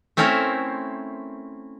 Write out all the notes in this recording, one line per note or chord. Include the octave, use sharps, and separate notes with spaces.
A3 C4 C#4 E4 A#4 C5